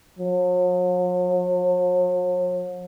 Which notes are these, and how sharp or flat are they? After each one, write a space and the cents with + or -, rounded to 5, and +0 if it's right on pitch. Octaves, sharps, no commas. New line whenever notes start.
F#3 -45